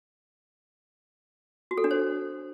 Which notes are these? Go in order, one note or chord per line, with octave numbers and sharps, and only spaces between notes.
F#4
A4
D4
C5